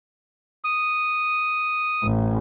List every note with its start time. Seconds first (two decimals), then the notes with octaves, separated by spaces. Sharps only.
0.64 D#6
2.03 A1